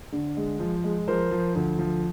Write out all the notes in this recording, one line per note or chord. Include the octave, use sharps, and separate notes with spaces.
D3
G#3
F3
G#3
F3 A#4 C5
F3
D2
F3